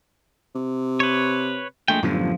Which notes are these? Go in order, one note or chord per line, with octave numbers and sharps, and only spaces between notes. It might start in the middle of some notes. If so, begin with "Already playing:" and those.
C3
B4 C#5
A#1 G#3 A3 G5
G1 F#2 A2 D3 F3